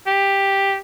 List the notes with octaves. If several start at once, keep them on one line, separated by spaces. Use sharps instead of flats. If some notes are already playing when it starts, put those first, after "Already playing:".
G4